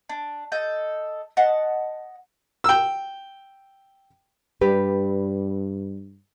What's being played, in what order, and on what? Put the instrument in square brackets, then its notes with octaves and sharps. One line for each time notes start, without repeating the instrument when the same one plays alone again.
[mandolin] D4
A4 D#5 G6
D#5 F#5 A5
[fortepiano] G5 E6
[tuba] G2 [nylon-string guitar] G3 G4 B4